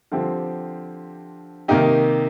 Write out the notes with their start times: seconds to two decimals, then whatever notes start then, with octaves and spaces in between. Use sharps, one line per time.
0.12 D3 F3 C4 G4
1.68 C3 D#3 A#3 D#4 G4